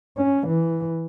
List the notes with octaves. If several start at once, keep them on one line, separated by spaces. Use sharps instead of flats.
C#4
E3